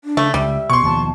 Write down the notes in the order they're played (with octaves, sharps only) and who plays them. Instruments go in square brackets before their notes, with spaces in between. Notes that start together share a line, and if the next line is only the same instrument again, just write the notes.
[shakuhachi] D4
[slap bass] C#3 [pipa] A3
[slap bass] C#2 [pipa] G3 [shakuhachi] E5
[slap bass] B2 [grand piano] C6 C#6
[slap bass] D#2 B2 F3 [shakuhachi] A5